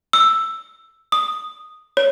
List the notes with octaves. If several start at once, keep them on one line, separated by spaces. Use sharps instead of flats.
E6
D#6
C#5